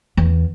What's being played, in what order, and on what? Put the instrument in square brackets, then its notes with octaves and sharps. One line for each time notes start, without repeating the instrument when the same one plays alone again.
[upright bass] E2